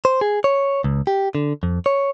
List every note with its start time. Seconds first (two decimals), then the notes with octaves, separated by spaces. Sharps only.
0.05 C5
0.21 G#4
0.44 C#5
0.84 C#2
1.07 G4
1.35 D3
1.63 F2
1.86 C#5